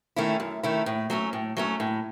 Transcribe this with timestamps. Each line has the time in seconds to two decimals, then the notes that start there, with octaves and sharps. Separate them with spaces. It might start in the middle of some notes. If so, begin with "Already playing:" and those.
0.16 D#3 A3 C#4 E4
0.40 F#2
0.63 D#3 A3 C#4 E4
0.86 A2
1.10 F#3 A3 C#4
1.33 A2
1.57 F#3 A3 C#4
1.80 A2